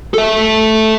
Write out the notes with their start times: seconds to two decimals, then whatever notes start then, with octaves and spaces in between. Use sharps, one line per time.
0.14 A4 E5